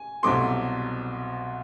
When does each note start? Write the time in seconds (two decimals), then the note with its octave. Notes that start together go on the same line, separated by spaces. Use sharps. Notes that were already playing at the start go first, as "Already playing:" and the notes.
Already playing: G#5
0.23 C2 B2 F#3 A3 C4 C6 D6